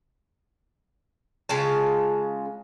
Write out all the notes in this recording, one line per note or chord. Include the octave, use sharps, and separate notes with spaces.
C#3 G#3 F4 A5